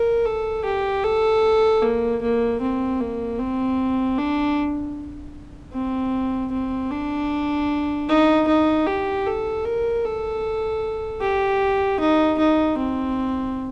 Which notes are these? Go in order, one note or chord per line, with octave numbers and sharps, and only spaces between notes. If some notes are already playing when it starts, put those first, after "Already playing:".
Already playing: A#4
A4
G4
A4
A#3
A#3
C4
A#3
C4
D4
C4
C4
D4
D#4
D#4
G4
A4
A#4
A4
G4
D#4
D#4
C4